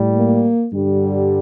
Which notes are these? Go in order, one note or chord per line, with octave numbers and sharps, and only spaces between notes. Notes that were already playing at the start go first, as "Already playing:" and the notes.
Already playing: A2 G3
A#3
G2 D3 G3